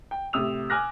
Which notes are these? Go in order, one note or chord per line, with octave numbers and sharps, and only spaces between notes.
G5
A2 C3 D#6 E6 F7
G#5 D6 F6 F#6 A#6